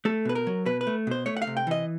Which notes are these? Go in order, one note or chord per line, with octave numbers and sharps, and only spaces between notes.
A3 A4
B2 B4
A#4
F#3
B2 B4
B4
A3
B2 C5
A3 C#5
F#5
F5
C3
G5
E3 D#5